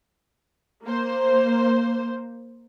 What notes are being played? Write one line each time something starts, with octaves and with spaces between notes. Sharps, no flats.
A#3 C5